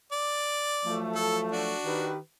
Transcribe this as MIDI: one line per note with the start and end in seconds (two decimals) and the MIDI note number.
0.12 1.01 74
0.85 1.75 53
0.85 1.75 54
0.85 1.75 57
1.15 1.39 69
1.52 2.11 62
1.52 2.11 66
1.85 2.18 51
1.85 2.18 67
1.85 2.18 71